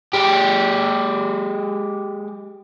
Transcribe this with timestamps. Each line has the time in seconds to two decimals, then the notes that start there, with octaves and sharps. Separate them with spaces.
0.14 G#3 G4